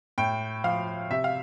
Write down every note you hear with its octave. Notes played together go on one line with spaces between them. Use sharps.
A2 G5
F3 F5
C3 E5
F5